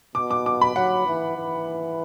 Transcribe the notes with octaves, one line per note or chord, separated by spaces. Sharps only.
B2 D6
D6
D6
B5
F#3 F#5
E3
E3